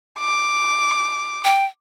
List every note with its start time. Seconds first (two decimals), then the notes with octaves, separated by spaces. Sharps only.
0.19 D6
1.44 G5